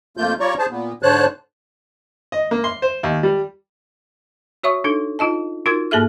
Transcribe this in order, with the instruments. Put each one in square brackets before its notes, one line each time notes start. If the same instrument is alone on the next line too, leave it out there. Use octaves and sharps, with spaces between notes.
[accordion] F2 A3 A#3 F4 G6
G3 F4 C#5 D5 A#5 C#6
G#4 C5 A5
A#2 B3
G#2 D3 C5 C#5 A5 F#6
[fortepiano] D#5
A#3
C6
C5
D#2
G3
[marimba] F#4 C#5 E5 C#6 D#6
D4 D#4 A4
D#4 F4 D#5 A5
D#4 F4 F#4 A#4 C6 G#6
G#2 A#3 G#4 A4 E5 F6